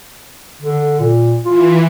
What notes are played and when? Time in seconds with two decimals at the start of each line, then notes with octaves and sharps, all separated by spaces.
0.62 D3
1.00 A#2
1.45 E3 F4